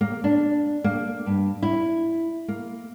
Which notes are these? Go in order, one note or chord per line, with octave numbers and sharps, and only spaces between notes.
A#3
D4
A#3
G2
E4
A#3